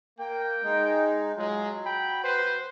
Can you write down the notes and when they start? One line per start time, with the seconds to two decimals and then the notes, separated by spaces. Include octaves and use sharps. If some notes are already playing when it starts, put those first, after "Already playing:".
0.19 A#3 G5
0.63 G#3 D#4
1.37 F#3 G#3 F4
1.85 G5 B5
2.24 B4 C5